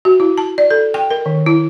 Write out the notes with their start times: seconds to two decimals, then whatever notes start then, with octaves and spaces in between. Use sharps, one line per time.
0.05 F#4
0.20 E4
0.38 A5
0.58 D5
0.71 A4
0.94 G5
1.10 A#4
1.26 D#3
1.46 E4